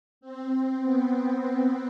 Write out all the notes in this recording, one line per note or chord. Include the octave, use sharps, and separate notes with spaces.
C4
B3